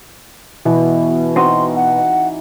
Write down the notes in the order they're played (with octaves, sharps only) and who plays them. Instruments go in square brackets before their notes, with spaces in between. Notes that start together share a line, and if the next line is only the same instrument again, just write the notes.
[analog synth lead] B2 [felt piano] E3 E4
[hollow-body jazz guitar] C4 D#4 F#4 [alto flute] C6
[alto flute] F#5